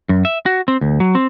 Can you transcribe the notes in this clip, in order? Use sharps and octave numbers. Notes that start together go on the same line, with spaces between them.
F#2
E5
F#4
C4
D2
F#3
C4